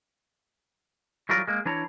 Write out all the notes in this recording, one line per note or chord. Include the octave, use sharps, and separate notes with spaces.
E3 F#3 G3 F4 A#4
G#3 A#3
E3 D4 E4 C#5 A#5